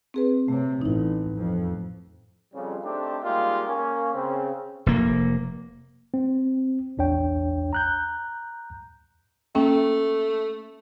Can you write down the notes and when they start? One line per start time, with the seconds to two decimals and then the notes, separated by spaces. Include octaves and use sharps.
0.14 C4 G#4 B4
0.48 C3 A3 C#5
0.81 A1 D#4 E4
1.37 F2
2.54 F2 C#3 G3
2.84 A3 C4 D4 D#4 G4
3.24 G3 G#3 A#3 D#4 F4 G4
3.67 A#3 C#4
4.13 C#3 C4
4.86 F1 A#3
6.14 C4
6.97 A#1 E2 D4 C#5 G5
7.73 A#5 F#6 G6
9.55 A3 A#3 C#4 G5